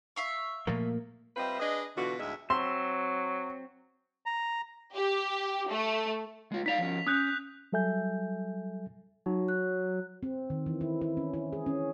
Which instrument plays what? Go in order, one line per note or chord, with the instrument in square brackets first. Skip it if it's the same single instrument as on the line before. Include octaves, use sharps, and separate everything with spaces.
[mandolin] E5 F5 C#6
[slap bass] A#2 F3 A3 [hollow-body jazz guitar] A#3
[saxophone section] G3 C4 F4 B4 D#5 E5
D4 G#4 B4 D#5
B2 D3 E3 D4 F4 F#4
D2 A2 G#3 D#4 E5
[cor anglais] F#3 [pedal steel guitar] C4 E5 [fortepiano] C6
[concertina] A#5
[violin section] G4
A3
[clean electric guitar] G#3 F4
[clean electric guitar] D#4 D5 F5 [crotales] B6 F7
[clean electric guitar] F3 C#4
[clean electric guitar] C#4 [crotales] D#6 F#6 G6
[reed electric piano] F#3 G3 A4 E5 G#5 G6
[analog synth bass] F#3 [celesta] D#4
[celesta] F#6
[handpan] C4
D#3
E3
E4
E4
C#4
E4
G#4
C#4